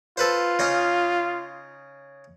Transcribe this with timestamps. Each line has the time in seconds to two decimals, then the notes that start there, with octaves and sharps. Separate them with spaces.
0.17 F4 A4 B4 C5
0.59 C#3 D#4 D#5